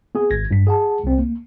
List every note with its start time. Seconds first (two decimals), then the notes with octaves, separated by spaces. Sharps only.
0.15 B3 G#4
0.30 G#1 G#6 A#6
0.51 G2 B6
0.67 G#4 F#5 A5
1.04 C2 C4
1.18 A#3